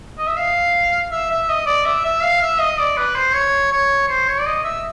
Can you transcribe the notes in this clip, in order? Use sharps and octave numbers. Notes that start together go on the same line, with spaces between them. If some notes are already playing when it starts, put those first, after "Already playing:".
D#5
E5
F5
E5
E5
D#5
D5
E5
E5
F5
E5
D#5
D5
B4
C5
C#5
C#5
C5
C#5
D5
D#5
E5